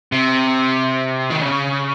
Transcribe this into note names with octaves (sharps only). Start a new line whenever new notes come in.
C3
D#3
C#3